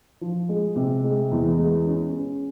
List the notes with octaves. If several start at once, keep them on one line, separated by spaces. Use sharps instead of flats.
F3
G#3
C3
G#3
E2
G#3
C#4
C#4